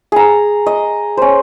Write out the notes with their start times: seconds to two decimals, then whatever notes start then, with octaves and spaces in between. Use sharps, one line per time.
0.12 G#4 A#5
0.66 D#5
1.17 C#4 C5